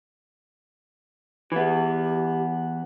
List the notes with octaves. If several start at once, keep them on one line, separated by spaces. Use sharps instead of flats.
E3 B3 G4